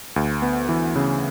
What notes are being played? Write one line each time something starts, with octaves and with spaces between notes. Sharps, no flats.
D2
B3
E3
C#3